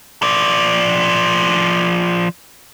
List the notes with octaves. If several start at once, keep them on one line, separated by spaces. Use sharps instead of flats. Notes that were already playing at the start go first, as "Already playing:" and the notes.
F3 D5